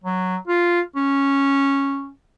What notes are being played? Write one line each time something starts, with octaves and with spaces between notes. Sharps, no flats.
F#3
F4
C#4